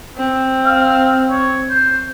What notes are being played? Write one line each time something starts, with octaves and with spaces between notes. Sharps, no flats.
C4
F5
C#5
C5